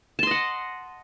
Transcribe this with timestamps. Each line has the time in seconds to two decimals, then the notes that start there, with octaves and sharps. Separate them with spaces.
0.19 A5
0.23 C6
0.27 D#5
0.31 F#5